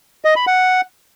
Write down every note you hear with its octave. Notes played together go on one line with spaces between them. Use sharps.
D#5
B5
F#5